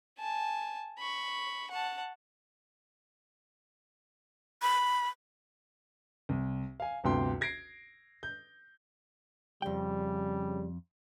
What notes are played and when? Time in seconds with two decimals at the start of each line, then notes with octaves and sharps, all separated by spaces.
0.19 G#5 A5
0.99 B5 C#6
1.71 F#5 A5
4.62 B5
6.29 C2
6.80 F5 G#5
7.04 G1 D2 C3 G5 C6
7.41 G#6 A#6 C7 D7
8.23 G6
9.62 F2 C#3 G3 G5